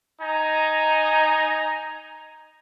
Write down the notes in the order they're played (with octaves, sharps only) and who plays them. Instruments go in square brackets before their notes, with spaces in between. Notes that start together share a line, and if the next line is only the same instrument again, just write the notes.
[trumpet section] D#4 G#5 A#5